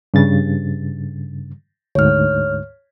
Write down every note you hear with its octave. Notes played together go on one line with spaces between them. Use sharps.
G2 C#3 A6
D2 G#2 C#5 F6